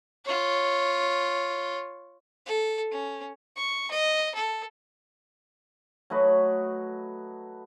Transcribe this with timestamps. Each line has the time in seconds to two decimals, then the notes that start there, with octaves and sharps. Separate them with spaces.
0.25 F4 C#5
2.46 A4
2.92 C#4
3.56 C#6
3.91 D#5
4.35 A4
6.10 F#3 A3 B4 D#5